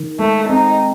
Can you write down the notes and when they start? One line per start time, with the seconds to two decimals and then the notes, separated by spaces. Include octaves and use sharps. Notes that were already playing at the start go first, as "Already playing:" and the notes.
Already playing: D#3
0.19 G#3 A3
0.49 C4 D#4